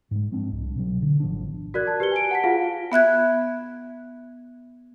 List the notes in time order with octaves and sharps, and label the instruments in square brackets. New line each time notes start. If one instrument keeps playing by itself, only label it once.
[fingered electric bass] G#2 G#3
F3 G#3 C4 D4
C2
B2 F#3
D3
G#1 F3 B3 D4
[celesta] F#4 A#4 D5 F#6 G#6
A5
G4 B4 C#7 G7
G#5 D7
F#5 A5 B6
F4 F#4 G#4 F5 F#5
[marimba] B3 E5 F#6 G#6